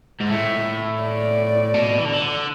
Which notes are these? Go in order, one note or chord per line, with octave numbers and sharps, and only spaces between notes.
G#2
A2 E5
D5
B2
E3
D3
E3
D3